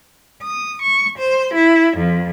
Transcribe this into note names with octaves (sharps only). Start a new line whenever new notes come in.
D#6
C#6
C5
E4
F2